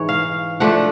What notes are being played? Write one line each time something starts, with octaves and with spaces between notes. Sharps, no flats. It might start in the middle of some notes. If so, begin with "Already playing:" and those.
Already playing: G#2 E3 C#5
F5
F3 A3 D4 F#5